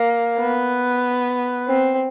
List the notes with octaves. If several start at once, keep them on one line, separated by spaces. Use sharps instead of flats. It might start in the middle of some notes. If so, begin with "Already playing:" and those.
Already playing: A#3
B3
C4